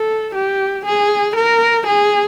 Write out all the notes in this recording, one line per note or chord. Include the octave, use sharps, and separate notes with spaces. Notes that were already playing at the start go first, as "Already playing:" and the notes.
Already playing: A4
G4
G#4
A#4
G#4